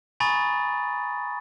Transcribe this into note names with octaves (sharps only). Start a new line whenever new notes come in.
G#5 A#5 B5 C#6 D#6 A6